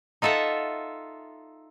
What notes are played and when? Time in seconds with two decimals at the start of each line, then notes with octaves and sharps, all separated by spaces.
0.22 D#4 F4 A4 E5 F#5